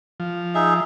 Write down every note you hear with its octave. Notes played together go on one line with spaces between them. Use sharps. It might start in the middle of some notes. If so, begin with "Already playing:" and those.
F3
D#4 G#4 E5